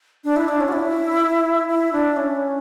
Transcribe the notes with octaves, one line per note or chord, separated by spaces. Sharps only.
D4
E4
D4
C#4
F#4
E4
E4
D4
C#4